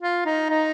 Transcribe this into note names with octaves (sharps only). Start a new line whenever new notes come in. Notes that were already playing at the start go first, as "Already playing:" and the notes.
F4
D#4
D#4